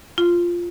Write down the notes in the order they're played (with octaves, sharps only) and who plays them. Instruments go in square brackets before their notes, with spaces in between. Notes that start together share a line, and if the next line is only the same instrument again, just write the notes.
[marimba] F4